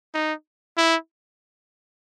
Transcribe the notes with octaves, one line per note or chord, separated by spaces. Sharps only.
D#4
E4